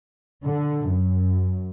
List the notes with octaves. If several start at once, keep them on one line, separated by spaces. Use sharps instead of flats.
D3
F#2